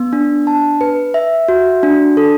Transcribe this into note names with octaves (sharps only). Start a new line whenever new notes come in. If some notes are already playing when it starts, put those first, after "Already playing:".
Already playing: B3
D4
A5
B4
E5
F#4
D4
A4